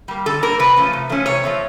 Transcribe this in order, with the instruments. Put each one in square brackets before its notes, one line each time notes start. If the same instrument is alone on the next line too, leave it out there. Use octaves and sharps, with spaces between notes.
[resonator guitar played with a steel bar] G3 A#3
D3 A4
G3 A#3 A#4
C3 B4
F3 A3 C#4
C3
F3 A3 C#4
C3 C#5
F3 A3 C4